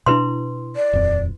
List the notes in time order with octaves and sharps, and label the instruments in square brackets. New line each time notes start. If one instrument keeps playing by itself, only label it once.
[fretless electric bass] B2 D4 [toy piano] E4 B4 C6
[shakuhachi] D5
[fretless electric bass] D#1 F2